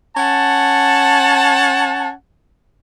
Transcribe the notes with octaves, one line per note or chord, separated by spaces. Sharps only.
C#4 F#5 A5